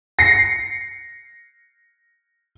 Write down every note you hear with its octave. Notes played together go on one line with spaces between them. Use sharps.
A#6 C7 C#7